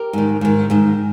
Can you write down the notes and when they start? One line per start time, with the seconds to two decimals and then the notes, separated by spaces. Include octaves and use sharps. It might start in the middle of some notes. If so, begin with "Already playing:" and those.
Already playing: G4 A#4
0.13 G#2 D#3
0.41 G#2 D#3
0.70 G#2 D#3